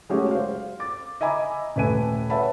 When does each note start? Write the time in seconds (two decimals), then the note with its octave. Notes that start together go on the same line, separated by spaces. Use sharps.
0.09 F#3 G#3 A3 C#4 F#4 G4
0.31 C5 F5
0.80 D6 A6
1.21 D#5 E5 G#5 A#5 B5 D6
1.76 D#1 A3 B4 G#5 D#7
2.30 B4 C#5 E5 F#5 A5 B5